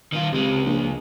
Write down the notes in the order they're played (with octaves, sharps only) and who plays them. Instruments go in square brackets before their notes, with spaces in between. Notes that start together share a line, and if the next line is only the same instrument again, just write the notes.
[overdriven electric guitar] D#3 F4
[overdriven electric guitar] C#2 G#3 [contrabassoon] C3
[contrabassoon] A#1